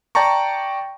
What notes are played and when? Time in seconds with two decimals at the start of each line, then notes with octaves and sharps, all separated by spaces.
0.15 D5 G5 A5 A#5 C#6